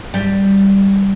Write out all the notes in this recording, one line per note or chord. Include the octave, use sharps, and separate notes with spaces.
G3